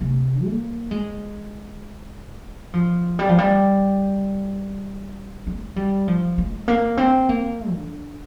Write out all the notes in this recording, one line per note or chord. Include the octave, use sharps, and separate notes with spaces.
C3
A#3
G#3
F3
G3
F3
G3
G#3
G3
F3
G#3
A#3
C4
A#3
D3